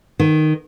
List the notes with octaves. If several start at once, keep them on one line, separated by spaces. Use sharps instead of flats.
D#3